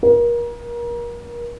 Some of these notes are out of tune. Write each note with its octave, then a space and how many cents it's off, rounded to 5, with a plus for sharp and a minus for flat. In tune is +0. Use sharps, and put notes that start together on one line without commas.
A#4 +30